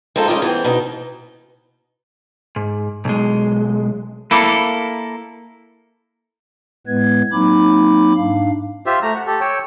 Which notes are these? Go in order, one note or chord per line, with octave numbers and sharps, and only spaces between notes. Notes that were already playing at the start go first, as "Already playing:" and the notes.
G#3 C4 D#4 F4 A4
G#3 C#4 D#4 F4 G4
E3 B3 C4
B2 B3 D#4
G#2
B1 G#3
A#3 E4 A4 B5 D6
A2 G#3 B3 B4 G#6
F#3 A#3 C4 D#4 B5 D6
G#2 D4 F5
F4 G4 C5 E5
A3 A#5
F#5
G4 A4
C#5 G5 E6